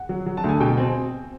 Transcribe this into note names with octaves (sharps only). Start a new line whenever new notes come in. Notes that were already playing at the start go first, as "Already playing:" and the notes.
Already playing: F#5
F#3
F#3
A5
D2 G#5
B2 G5
C4 G#5